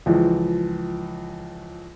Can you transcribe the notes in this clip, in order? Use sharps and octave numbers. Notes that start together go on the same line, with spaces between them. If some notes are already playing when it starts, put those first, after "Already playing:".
C#2 E3 F3